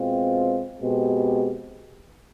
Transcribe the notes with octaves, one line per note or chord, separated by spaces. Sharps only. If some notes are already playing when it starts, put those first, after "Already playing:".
Already playing: B2 G#3 C4 F4
B2 G#3 C4 G4